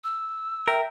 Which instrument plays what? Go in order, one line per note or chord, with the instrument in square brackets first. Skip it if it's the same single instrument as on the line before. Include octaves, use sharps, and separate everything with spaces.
[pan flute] E6
[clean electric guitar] A#4 [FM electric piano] E5 G5